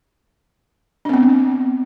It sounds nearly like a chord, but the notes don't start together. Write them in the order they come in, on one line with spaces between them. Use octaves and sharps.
D4 C4 B3